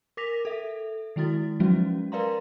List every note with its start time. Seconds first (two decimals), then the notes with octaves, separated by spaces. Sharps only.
0.17 A#4 D6 A#6 B6 F7
0.45 A4 E5
1.16 D#3 G#3 E4 F#4 A6
1.60 F3 F#3 G#3 C#4 F#4
2.12 A#4 B4 D5 F5 A#5 C6